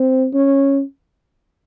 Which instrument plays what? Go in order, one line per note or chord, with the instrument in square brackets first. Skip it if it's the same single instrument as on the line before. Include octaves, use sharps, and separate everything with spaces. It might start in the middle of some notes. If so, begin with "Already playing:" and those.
Already playing: [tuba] C4
C#4